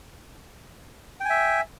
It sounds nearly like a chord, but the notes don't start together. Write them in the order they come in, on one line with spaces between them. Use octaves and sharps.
G5 G#5 E5